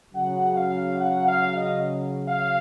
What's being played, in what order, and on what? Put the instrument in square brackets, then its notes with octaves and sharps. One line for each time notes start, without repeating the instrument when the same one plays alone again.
[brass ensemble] C#3 F#3 F#5
F5
F#5
F5
D#5
F5